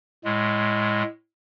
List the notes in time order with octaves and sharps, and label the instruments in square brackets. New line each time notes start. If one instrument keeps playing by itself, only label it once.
[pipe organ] A2 G#3